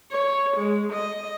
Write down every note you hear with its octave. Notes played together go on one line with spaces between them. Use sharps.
C#5
G#3
D#5